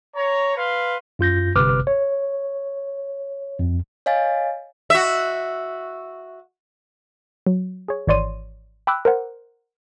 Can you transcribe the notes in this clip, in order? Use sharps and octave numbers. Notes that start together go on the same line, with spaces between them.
C#5 A#5
B4 F5 C6
F#2 F4 G6 A#6
G1 C3 B4 D6 F6 F#6
C#5
F2
C#5 D#5 F5 G#5 A6
F#4 E5
F#3
G#4 C#5
G#1 E3 C#5 D5 C6 D#7
G5 B5 D6 E6 F#6
A#4 C5 F#5